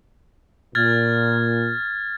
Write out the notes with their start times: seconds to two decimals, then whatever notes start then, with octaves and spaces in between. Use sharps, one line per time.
0.75 A#2 F6 G#6 A6